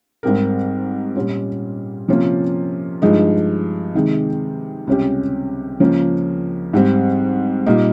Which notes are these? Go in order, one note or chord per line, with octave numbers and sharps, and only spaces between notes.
G#2 G3 C4 G4 A#4
A#2 G3 C#4 F4
C3 F3 A#3 C#4 F4
G2 F3 G#3 D#4
C3 D#3 G#3
C#2 C3 G3 C#4 G4
C#2 C#3 F3 A#3 C#4
G#2 G3 C4
A#2 G3 A#3 D#4